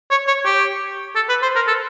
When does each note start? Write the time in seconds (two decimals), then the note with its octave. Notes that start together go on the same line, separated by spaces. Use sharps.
0.11 C#5
0.27 C#5
0.45 G4
1.16 A4
1.29 B4
1.42 C5
1.55 A#4
1.67 A4